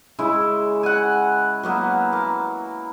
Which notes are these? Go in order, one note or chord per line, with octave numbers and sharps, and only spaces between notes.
C#3 G#3 E4
F#5 G#5
F#3 A#3 B3
A#3